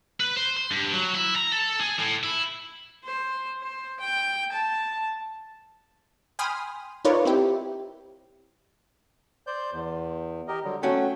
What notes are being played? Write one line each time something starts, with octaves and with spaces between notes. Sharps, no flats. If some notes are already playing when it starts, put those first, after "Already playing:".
B4
C5
C6
G2
F#3
E4
A#5
A4
G#4
A2
E4
C5
C5
G5
A5
G5 G#5 B5 C6 D#6 F6
D#4 F4 A#4 B4 C#5 D5
C4 E4 G4
C5 D5 G6
E2
G4 A#4 D#5
D3 F#3 G3
A3 C#4 F#4 G5